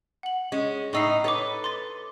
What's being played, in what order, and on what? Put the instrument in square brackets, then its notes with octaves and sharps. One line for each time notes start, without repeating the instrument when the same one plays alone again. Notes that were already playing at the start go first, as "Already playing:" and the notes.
[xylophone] F#5 F#7
[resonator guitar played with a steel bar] G#3 C#4
[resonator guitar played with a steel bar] A2 D#4 [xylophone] C#6 E6 C7
[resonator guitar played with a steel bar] A4 B4 [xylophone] C#5 D6
[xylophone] C6 D6 A6